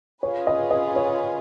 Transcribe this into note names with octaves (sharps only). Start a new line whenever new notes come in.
C#4 F4 G#4 B4 C#5
D#5
D#5
C#5